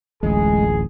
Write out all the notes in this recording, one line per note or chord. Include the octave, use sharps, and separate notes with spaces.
D1 A1 G#3 G#4